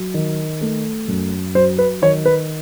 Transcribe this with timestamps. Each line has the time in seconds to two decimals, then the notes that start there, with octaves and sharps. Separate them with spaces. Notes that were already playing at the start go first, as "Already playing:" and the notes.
Already playing: F#3
0.14 D#3
0.61 A3
1.08 F#2
1.55 F#3 C5
1.78 B4
2.02 D#3 C#5
2.25 B4